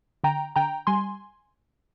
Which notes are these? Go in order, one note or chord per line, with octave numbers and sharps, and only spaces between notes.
D3 G5 A#5
D3 G5 A#5
G3 G#5 C6